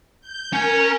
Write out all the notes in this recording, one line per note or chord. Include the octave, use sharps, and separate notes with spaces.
G6
C#4 A#4 G#5